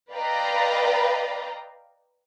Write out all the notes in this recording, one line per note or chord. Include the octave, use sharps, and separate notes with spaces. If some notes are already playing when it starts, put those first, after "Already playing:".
B4 D5 D#5 F5 G5 A#5